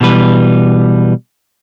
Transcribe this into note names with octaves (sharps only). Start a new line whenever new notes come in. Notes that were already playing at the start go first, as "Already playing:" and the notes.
B2 E3 G3 B4